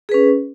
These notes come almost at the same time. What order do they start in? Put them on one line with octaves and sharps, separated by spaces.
G#4 B4 C#4